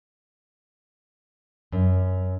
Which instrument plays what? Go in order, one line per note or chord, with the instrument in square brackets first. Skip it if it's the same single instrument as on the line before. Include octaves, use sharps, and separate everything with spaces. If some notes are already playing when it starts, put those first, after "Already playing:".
[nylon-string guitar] F#2